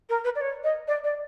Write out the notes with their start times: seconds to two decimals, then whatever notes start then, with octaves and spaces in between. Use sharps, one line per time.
0.09 A#4
0.24 B4
0.36 D5
0.41 C#5
0.64 D#5
0.88 D5
1.04 D5